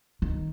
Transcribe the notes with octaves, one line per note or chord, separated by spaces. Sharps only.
D#3